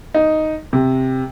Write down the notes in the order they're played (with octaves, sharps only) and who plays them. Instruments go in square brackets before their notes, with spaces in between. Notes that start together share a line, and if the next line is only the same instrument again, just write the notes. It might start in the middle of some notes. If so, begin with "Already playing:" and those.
[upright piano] D#4
C3